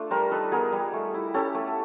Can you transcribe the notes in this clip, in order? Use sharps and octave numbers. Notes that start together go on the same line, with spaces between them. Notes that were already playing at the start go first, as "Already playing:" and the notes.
Already playing: A3 D4 F4
G3 A#4 C5
D#4 A4 B4
B3 G#4 A#4
G3
A3
E4
C#4 G4 A4
A3